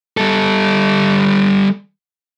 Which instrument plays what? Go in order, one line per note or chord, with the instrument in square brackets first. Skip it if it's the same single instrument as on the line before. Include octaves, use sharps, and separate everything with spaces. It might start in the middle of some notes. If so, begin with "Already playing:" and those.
[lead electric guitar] G3 A4